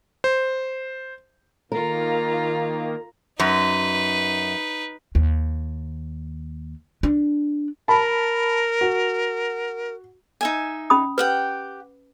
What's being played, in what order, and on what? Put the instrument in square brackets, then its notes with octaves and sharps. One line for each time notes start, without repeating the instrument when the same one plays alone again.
[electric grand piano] C5
[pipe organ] D#3 A#3 [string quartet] F4 A#5 [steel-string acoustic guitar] A#4
[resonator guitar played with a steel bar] F#2 [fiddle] D#4 B4
[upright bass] D#2
D4
[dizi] A#4 [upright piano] A5 B5
[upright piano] F#4
[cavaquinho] D#4 E5 G#5
[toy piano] C#4 B5 D#6
[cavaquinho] G4 F#5 G5 [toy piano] B4